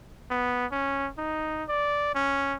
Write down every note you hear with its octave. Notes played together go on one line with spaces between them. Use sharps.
B3
C#4
D#4
D5
C#4